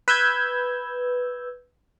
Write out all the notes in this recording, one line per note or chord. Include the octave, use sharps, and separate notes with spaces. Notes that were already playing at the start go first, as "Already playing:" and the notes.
B4 E6 G6 G#6